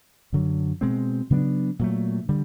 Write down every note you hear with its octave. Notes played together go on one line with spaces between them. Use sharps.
F#2 D3 F#3
B2 G#3 C4
C#3 F#3 B3 D4
A#2 F#3 A3
D3 G3